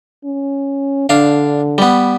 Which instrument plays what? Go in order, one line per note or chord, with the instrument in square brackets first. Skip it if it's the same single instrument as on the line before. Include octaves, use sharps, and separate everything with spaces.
[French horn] C#4
[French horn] D3 [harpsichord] D4 F5
[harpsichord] G3 B3